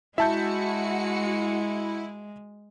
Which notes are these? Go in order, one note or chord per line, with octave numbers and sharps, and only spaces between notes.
G#3 E4 F#4 E5 A5 G6 C#7